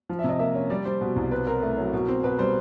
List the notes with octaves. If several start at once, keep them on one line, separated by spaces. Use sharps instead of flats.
F3
E5
C3 D#5
A#3 E5
C#4
G3 D5
G3 C5
B2
C2
C4 B4
C4 A#4
A3
F#3
B2
C4
B2 B4
G3 C5